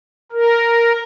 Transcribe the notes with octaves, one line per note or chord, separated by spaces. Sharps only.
A#4